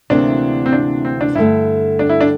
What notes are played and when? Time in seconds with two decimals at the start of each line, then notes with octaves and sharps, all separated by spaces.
0.10 D2 C3 E3 A#3 D4
0.66 C4
0.73 D4
1.05 C4
1.21 D4
1.35 G2 D3 A3 E4
1.99 D4
2.09 E4
2.21 D4